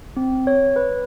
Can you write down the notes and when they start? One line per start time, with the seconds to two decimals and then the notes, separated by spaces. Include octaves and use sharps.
0.17 C4
0.47 C#5
0.76 B4